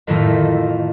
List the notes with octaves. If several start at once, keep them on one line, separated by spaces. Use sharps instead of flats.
F2 A2 D#3 F3 A3 D#4